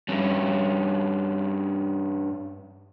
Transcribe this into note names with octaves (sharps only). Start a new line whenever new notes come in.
G2 C#4